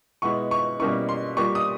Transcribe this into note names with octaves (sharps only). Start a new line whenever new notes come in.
B2 G#3 B3 E4 C#6
C#6
B2 G3 A#3 C#4 E4 C#6
C6
A#2 G3 A#3 C#6
D#6